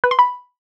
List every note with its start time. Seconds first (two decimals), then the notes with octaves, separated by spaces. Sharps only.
0.04 B4
0.11 C6
0.19 B5